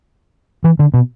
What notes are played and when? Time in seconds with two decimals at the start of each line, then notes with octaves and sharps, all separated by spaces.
0.64 E3
0.79 D3
0.94 B2